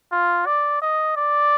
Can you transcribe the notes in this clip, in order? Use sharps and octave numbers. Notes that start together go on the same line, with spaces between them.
F4
D5
D#5
D5